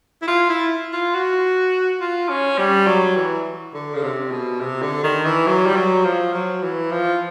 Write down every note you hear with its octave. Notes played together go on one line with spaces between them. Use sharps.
E4
F4
E4
F4
F#4
F4
C#4
G3
F#3
E3
D3
C#3
C3
B2
C3
D3
D#3
E3
F#3
G3
F#3
F3
F#3
E3
F3